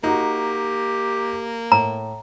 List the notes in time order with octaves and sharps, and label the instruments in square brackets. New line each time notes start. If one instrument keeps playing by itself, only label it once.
[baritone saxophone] A#3 [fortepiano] D#4 F#4 [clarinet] G4
[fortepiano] A2 [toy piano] A#5